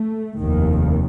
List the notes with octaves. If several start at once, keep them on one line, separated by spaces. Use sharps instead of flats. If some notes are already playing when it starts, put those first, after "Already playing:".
Already playing: A3
F1 D#2 D#3